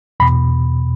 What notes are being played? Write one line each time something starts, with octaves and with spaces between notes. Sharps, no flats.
E2 B2 B5